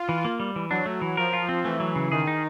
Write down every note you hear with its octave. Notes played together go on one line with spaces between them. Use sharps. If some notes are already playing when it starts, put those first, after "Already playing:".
Already playing: F4
E3
A#3
G3
E3
F#3 D4
A3
E3
F3 A#4
F4
C4
E3 A3
F#3
C#3
D#3 G#4
D#4